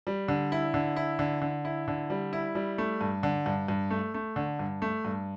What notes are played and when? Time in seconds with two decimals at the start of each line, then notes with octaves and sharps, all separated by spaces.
0.07 G3
0.28 D3
0.52 E4
0.74 D3
0.96 E4
1.19 D3
1.42 D3
1.65 E4
1.88 D3
2.10 G3
2.33 E4
2.55 G3
2.78 A3
3.01 G2
3.23 D3
3.46 G2
3.68 G2
3.91 A3
4.14 A3
4.36 D3
4.59 G2
4.82 A3
5.05 G2